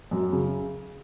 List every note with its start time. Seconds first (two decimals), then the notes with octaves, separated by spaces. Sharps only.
0.11 F#2
0.32 C#3